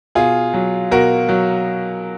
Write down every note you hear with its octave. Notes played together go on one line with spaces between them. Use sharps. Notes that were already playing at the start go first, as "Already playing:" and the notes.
B2 F4 G#4
F#3
B2 F#4 A#4
F#3